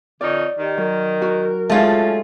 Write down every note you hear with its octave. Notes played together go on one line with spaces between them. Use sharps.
F2 D3 D#4 C#5 D5
D#3 G4
F#3 A#4
F#4
F3 G#3 A3 C#4 D#4 F4 G#4